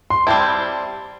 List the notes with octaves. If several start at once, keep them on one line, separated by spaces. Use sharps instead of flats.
C6
G3 C4 E4 A5